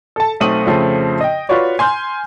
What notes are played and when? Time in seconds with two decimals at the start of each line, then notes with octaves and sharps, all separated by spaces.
0.16 A4 A5
0.40 B1 A3 C4 D#6 D#7 F#7
0.66 F2 C#3 F3 A3 C4
1.21 D#5 G5
1.49 F4 F#4 B4 C#5 D5
1.79 G#5 C6 F6 G6